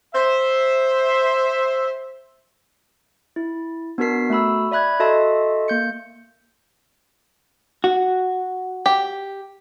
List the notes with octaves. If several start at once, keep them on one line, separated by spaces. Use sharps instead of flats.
C5 E5
E4
B3 D4 F#4 A#4 B6 C7
A3 F#4 B5 E6
D5 E5 B5 F#6 G#6
F#4 A4 D#5 E5 A5 C6
A#3 G6 C#7
F#4
G4